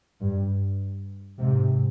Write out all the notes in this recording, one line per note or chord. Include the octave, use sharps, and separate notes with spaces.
G2
G#2 C3